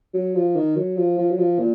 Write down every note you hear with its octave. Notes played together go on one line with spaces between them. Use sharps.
F#3
F3
D#3
F#3
F3
F3
F#3
F3
A#2